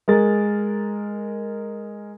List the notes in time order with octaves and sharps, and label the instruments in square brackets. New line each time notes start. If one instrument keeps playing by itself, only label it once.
[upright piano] G#3 A#4 A6